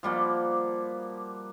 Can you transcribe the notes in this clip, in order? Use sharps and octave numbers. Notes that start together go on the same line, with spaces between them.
F3 G3 A#3 F#4